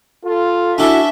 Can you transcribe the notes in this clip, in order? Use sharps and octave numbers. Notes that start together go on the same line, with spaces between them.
F4 A4
C#4 D4 E4 F#4 A4 E5